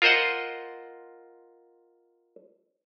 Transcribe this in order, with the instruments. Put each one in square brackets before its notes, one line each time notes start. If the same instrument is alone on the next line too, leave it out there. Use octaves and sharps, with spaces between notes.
[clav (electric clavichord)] F4 A#4 C5 D#5 F#5